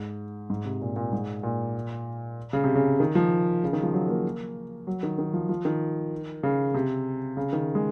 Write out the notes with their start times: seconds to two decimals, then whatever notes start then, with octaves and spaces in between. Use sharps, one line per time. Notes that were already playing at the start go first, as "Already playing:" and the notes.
Already playing: G#2
0.50 G#2
0.65 C3
0.81 A#2
0.96 A#2
1.13 G#2
1.43 A#2
2.53 C#3
2.64 C3
2.75 C#3
3.00 D#3
3.15 F3
3.64 C#3
3.73 D#3
3.83 F3
3.94 F#3
4.08 A#3
4.87 F#3
5.03 D#3
5.18 D#3
5.33 F3
5.49 F3
5.65 D#3
6.43 C#3
6.74 C3
7.37 C#3
7.53 D#3
7.75 G#3